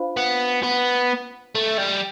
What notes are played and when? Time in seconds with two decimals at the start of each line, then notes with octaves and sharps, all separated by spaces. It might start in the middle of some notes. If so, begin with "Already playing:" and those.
Already playing: D4 F4 C5 F5 B5
0.17 B3
0.63 B3
1.55 A3
1.78 G3